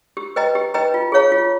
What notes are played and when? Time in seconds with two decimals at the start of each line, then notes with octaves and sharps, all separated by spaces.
0.17 G4
0.36 B4 D#5 G5 A#5
0.55 G4
0.74 B4 D#5 G5 A#5
0.94 F4
1.12 G#4 C#5 F5 A#5
1.32 F4